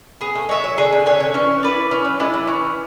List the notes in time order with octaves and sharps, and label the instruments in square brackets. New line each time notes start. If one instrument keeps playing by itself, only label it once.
[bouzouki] B3 [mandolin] G#4
[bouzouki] A3
[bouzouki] G#3 [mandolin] C#5 E5 G#5
[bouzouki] F#3
[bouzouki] D3 [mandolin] G#4
[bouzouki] D3
[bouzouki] D3 [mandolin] C#5 E5 G#5
[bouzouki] D3
[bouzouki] E3 [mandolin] C#4
[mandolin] E4 B4 D5
[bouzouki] E3 [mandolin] C#4
[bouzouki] F#3
[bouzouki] G#3 [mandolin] E4 B4 D5
[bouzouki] F#3
[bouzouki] E3 [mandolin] C#4